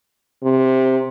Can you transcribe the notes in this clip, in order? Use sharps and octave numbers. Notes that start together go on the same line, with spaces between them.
C3